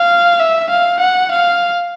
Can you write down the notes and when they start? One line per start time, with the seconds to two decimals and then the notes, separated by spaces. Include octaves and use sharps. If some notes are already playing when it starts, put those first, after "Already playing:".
Already playing: F5
0.39 E5
0.70 F5
1.00 F#5
1.32 F5